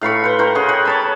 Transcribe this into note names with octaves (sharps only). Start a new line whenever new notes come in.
A2 F5 B5 C#6
B4 C5
A#4 C5 G5 C#6
C#3 G#4 F#5 C#6
G4 G#4 C#5 F#5
C#5 A5 B5